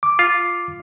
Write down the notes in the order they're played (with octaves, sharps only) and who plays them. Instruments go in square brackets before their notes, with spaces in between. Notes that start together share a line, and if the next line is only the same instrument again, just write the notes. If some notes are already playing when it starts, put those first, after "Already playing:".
[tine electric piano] D6
[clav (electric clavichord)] F4